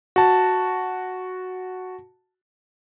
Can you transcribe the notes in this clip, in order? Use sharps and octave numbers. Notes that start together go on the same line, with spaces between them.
F#4 A5